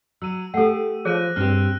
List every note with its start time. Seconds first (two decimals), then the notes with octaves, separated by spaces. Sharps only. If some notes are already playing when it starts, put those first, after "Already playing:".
0.22 F#3 E6 D#7
0.54 A3 G4 A4 F#5
1.05 F3 G#4 C#5 F#6 A#6 D#7
1.36 G2 C4 G4 F6